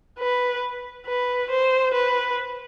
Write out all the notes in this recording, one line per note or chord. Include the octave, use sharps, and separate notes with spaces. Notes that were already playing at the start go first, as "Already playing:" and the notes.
B4
B4
C5
B4